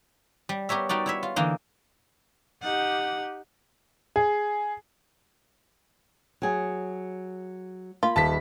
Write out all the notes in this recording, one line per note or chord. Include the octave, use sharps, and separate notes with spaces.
G3
B3 G4 A#4 C#5 E5
G3 D#4 F#4 D5
E4 C#5 E5
F4
D3 E3 A#3 D#4
D#4 G4 F#5
G#4
F#3 G#4
A#3 F4 B5
D#1 A5 B6